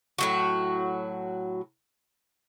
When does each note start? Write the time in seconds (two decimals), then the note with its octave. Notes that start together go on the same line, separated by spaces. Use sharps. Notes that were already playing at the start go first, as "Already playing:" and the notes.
0.18 A2 F#3 F#4